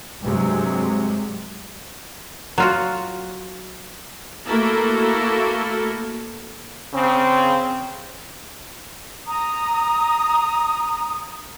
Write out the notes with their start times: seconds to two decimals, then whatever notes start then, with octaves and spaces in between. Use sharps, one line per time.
0.22 G2 C3 F#3 G#3
2.58 F#3 F4 F#4
4.45 A3 A#3 E4 F#4 A4 A#4
6.93 C#3 C4
9.27 A#5 D#6